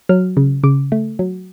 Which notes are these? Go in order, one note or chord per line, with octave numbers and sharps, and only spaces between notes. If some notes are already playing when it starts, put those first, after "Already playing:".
F#3 F6
C#3
C#3 D6
A3
F#3